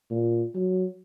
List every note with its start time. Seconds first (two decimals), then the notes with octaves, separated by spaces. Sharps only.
0.11 A#2
0.55 F#3